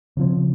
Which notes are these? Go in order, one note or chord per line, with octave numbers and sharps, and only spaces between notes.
C#3 F3 C4